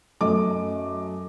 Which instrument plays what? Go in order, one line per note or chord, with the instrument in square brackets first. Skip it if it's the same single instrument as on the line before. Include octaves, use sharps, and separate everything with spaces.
[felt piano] F#2 A3 D#5 D6